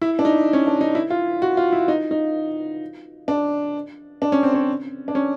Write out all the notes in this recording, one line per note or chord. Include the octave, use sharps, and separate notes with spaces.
E4
D4
D#4
C#4
D4
D#4
E4
F4
F#4
F4
E4
D#4
D#4
D4
D4
C#4
C4
C#4
D4
C#4